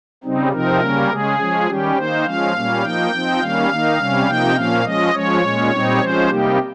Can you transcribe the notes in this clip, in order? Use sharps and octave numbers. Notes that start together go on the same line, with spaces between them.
C#3 G3 C4 D#4
C3 F3 C4 D#4 A#4
C#3 G3 A#3 C#4
C#3 G#3 C#4 G#4
F3 G#3 C#4
D#3 G3 C#4 G4
D#3 A#3 D#4 C5
F3 G#3 C#4 F5
A#2 G3 A#3 C#4
F3 A#3 D#4 G5
F3 C4 D#4
D#3 G3 A#3 C#4 F5
D#3 A#3 D#4
C3 G3 C#4
C3 F3 A#3 D#4 G5
A#2 F3 A#3 C#4 F5
F3 G#3 C#4 D#5
F3 G#3 C#4 C#5
A#2 G#3 C#4
A#2 G3 C4 D#4
F3 G#3 C#4 C5
C3 G3 A#3 D#4 G4